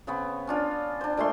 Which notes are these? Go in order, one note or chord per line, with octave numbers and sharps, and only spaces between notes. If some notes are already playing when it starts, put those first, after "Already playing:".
C#3 B3 C4 C#5
C#4 D4 F4
D4 C5
A#2 G#3 A3 C6